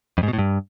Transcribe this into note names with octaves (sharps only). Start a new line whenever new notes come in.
F2
G#2
B2
A2
G2